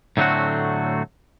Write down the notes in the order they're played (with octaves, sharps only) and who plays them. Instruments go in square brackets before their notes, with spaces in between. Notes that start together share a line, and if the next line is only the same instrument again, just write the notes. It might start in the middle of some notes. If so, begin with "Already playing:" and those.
[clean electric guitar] A2 D3 F#3 A3 C4 F#4